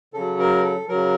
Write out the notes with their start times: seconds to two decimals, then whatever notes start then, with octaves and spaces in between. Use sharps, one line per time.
0.13 C#3 F#3 A4
0.39 A#4
0.63 A4
0.88 C#3 F#3 A#4